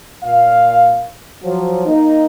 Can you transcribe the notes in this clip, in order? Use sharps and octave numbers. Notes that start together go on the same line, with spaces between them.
A#2 F5
F3 F#3
A#3 D#4